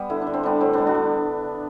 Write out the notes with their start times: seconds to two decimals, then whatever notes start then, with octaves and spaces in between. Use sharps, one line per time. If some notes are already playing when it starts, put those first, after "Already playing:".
Already playing: G3 B3
0.10 D3 E4
0.22 D4
0.27 D3
0.34 C4
0.43 G3 B3 D4
0.61 A2 C4
0.73 G3 B3 D4
0.86 D4 F#4
0.95 G3